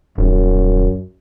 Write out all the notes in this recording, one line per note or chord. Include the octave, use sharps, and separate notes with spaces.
D#1 F#2